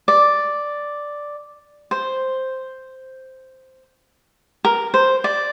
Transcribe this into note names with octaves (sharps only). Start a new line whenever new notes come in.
D5
C5
A#4
C5
D5